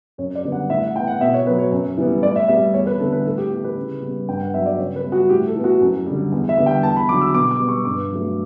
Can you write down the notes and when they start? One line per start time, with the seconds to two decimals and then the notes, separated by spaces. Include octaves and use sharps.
0.18 F#2 C#5
0.35 D5
0.44 D3 G3 B3
0.52 F#5
0.69 A2 E5
0.83 F#5
0.95 E3 G5
0.98 B3
1.08 F#5
1.21 B2 E5
1.34 C#5
1.46 F#3 B3 B4
1.59 C#5
1.72 F#2
1.97 E3 G3 B3
2.23 A2 D5
2.36 E5
2.48 G3 B3 E5
2.74 E2 C#5
2.87 B4
3.00 D3 G3 B3 A4
3.12 B4
3.26 A2 A4
3.38 G4
3.50 E3 B3 G4
3.64 B4
3.77 C#3
4.02 G3 B3
4.28 G2 G5
4.41 F#5
4.53 F#3 B3 E5
4.66 D5
4.78 C#3 C#5
4.96 B4
5.04 G3 B3
5.12 F#4
5.29 A2 G4
5.47 A4
5.56 E3 B3
5.64 F#4
5.81 F#2
6.06 D3 G3
6.32 E2
6.49 E5
6.58 D3 G3 B3
6.66 G5
6.83 E2 A5
6.96 B5
7.09 D3 F#3 D6
7.21 E6
7.34 B2 D6
7.51 D6
7.60 G3 B3
7.69 C#6
7.85 G2 D6
8.11 F#3 A3